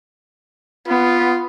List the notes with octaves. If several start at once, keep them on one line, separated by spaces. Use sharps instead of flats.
B3 F4